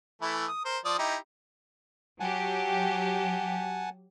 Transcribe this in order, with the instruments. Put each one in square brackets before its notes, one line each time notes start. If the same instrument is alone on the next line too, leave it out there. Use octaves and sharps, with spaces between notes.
[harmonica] E3 A3 E4
D#6
A#4 C5
F3 D5 D#6
D#4 E4 G4
[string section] F#3 G4 [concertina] F#5 G#5 A5